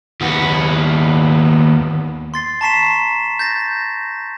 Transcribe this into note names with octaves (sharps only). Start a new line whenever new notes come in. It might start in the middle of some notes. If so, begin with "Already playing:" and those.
D#2 B3
C6 A6 C7
A5 A#5 C#6 B6 C7 E7
G6 A6 A#6